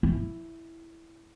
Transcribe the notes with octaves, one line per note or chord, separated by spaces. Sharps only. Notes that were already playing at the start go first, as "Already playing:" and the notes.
E4